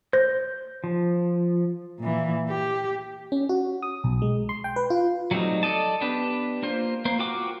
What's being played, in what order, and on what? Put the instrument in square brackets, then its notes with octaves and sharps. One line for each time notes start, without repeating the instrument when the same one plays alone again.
[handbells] C5 A#6 [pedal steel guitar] G6
[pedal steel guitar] F3
[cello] A#2 E3
G4
[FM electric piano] C#4
F#4
D#6
B1
G#3
C6
G5
B4
F4
[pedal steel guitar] F#3 G3 A3 C4 D#4
A4 D5 D#5 A5
B3 D4 G4 B4
A#3 F4 C5
A#3 C5
F4 F#4 A#4 G5 D6